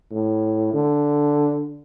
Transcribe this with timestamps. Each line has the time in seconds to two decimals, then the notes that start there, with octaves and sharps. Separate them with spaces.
0.11 A2
0.74 D3